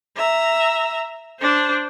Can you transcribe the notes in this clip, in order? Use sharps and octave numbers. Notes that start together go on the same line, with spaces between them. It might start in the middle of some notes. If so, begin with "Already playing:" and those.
E5 A#5
D4 C5